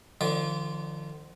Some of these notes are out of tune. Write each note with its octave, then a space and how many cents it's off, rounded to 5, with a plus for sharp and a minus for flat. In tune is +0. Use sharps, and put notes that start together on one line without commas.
D3 +45 F3 -20 D5 -35